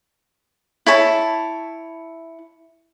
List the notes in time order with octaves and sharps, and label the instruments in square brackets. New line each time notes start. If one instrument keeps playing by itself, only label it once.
[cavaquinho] E4 C#5 A5